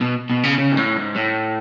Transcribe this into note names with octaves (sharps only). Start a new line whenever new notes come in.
B2
B2
C#3
C#3
G#2
A2
G#2
A2